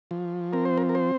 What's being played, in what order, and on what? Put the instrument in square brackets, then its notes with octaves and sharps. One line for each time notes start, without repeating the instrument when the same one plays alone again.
[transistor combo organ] F3
C4 A#4
C5
A#4
A#4
C5